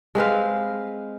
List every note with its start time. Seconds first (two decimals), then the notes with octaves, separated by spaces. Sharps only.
0.15 G#3 C4 B4 F5